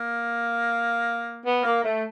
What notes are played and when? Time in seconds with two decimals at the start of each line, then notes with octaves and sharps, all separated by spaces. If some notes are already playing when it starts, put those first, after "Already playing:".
Already playing: A#3
1.45 B3
1.63 A#3
1.83 A3